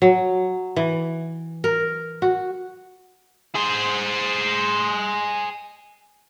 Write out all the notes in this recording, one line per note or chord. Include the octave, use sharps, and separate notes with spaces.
F#3
E3
A#4
F#4
G#4 C5